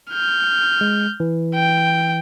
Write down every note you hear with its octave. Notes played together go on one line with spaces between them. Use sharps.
F6 G6
G#3
E3
G5